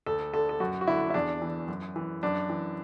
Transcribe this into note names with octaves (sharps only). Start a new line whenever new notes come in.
D2 A4
D3 A4
A4
F#2 F#4
F#4
D3 E4
E4
E2 D4
E3
F#2
E3
F#2 D4
E3